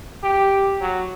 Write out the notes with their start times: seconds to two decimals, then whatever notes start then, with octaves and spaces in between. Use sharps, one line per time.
0.24 G4
0.81 F#3